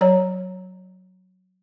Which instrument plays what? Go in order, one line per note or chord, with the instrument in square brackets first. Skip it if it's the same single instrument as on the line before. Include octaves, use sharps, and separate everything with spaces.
[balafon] F#3 C#5 A#5